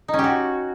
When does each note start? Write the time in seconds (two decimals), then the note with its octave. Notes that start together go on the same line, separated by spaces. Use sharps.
0.08 D#4
0.14 C#4
0.19 G4
0.24 F#4